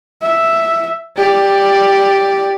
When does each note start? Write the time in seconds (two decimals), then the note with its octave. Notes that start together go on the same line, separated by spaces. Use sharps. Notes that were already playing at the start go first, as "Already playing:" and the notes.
0.22 E5
1.17 G4 D5